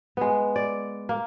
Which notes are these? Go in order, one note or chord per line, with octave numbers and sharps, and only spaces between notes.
G#3 B3
D5
A#3